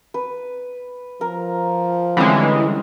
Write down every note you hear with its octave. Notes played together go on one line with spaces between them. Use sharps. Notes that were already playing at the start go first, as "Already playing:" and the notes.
B4
F3 A#4
D3 E3 G3 G#3 C4 C#4 G#5